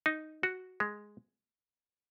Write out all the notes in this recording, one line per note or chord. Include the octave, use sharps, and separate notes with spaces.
D#4
F#4
G#3